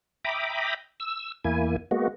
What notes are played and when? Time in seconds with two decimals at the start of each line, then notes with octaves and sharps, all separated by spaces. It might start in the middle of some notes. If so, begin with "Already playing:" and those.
0.25 E5 G5 A#5 B5 D6 D#6
1.00 E6
1.45 E2 A#3 E4 G#5
1.91 G#3 A#3 B3 F#4